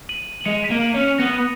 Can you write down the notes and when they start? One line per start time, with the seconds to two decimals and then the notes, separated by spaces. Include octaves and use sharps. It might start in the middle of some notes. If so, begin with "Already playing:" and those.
0.09 D#7 F#7
0.41 F#7
0.46 G#3 C#7 F7
0.64 B6 D#7
0.71 A#3
0.82 D#7 F#7
0.94 C#4
1.00 C#7 F7
1.18 B3 A#6 C#7